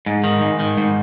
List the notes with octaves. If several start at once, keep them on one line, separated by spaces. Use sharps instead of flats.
G#2
D#3
G#2
D#3
G#2